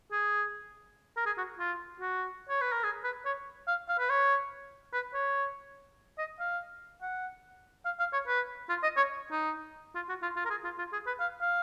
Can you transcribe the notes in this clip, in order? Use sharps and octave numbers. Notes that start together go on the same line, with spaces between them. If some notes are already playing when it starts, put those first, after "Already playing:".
G#4
A#4
G#4
F#4
F4
F#4
C#5
B4
A#4
G#4
B4
C#5
F5
F5
B4
C#5
B4
C#5
D#5
F5
F#5
F5
F5
C#5
B4
F4
D#5
C#5
D#4
F4
F#4
F4
F4
A#4
G#4
F4
F4
G#4
B4
F5
F5